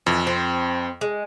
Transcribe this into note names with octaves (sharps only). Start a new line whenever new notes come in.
F2 E3
C4
G#3